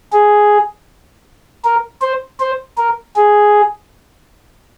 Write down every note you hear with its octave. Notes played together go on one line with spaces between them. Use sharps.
G#4
A#4
C5
C5
A#4
G#4